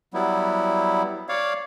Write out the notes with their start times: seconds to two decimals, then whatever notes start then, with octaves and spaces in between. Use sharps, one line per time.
0.14 F#3 G3 B3 E4
1.29 C#5 D5 F5